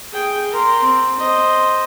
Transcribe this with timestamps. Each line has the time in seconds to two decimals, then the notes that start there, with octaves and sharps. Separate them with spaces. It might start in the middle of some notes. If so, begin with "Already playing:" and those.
0.13 G#4 G5
0.51 A#4 C6
0.83 C4
1.19 C5 D#5